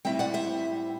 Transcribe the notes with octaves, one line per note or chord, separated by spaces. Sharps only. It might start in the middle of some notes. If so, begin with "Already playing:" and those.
A2 G3 C4 E4 E5 G5
D5 F#5
C5 E5